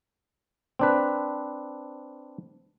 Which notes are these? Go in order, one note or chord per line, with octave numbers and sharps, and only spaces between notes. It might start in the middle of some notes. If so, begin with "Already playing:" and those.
C4 D4 B4